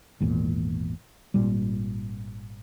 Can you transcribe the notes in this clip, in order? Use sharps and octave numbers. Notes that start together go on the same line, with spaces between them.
G#1 E2 A#2
G#1 A#2 G3